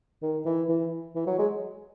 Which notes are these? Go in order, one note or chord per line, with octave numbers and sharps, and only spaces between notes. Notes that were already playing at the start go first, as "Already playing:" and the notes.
D#3
E3
E3
E3
F#3
G#3